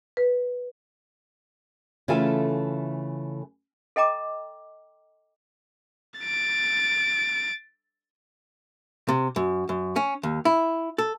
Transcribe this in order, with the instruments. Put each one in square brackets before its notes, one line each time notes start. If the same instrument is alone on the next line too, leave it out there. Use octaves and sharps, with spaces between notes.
[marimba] B4
[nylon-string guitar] C#3 E3 A3 F4 A4 G#5
[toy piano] A4 D#5 G5 A#5 D6
[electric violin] A6 D7
[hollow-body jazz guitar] C3
F#2
F#2
C#4
D#2
E4
A4